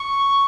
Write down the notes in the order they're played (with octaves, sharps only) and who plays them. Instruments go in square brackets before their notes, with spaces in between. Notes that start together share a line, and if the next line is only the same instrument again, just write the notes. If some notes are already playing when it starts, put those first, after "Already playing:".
Already playing: [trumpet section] C#6